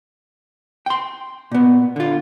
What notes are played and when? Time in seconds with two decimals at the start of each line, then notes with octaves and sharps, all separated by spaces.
0.86 G5 C6
1.52 A#2 B3
1.96 D3 F4